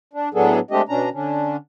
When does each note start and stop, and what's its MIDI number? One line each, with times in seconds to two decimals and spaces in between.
0.13 0.29 62
0.34 0.59 45
0.34 0.59 54
0.34 0.59 59
0.34 0.59 62
0.34 0.59 68
0.34 0.59 69
0.71 0.82 56
0.71 0.82 57
0.71 0.82 60
0.71 0.82 62
0.71 0.82 67
0.71 0.82 75
0.89 1.09 47
0.89 1.09 61
0.89 1.09 62
0.89 1.09 82
1.13 1.56 50
1.13 1.56 61
1.13 1.56 62